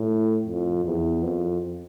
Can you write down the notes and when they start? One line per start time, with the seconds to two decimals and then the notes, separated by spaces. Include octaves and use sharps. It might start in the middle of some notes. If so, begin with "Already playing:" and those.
Already playing: A2
0.46 F2
0.85 E2
1.23 F2